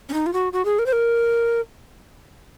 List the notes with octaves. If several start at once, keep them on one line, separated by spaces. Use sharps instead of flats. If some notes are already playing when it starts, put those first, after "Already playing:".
C#4
D#4
F4
F#4
F#4
G#4
A#4
C5
A#4